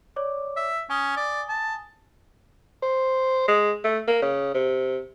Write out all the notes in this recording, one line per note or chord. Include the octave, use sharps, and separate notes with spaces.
C#5 D5 D6
E5
C#4 G#5 D#6 G7
D5
A5
C5
G#3
A3
A#3
C#3
C3